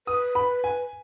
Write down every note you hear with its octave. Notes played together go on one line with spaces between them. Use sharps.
B4 D#6
B5
G#5